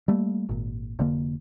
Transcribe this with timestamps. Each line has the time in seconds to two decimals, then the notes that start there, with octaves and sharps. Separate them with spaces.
0.08 G3 A3 A#3
0.49 G#1 A#2
0.99 F1 D3 A#3